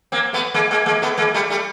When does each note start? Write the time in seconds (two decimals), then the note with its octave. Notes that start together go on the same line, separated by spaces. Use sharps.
0.12 A#3 C4
0.33 A3 B3
0.54 G#3 A#3
0.71 G#3 A#3
0.86 G#3 A#3
1.02 A3 B3
1.17 G#3 A#3
1.34 G3 A3
1.50 G3 A3